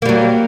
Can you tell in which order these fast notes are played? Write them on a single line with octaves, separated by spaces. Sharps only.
A#3 G3 F#3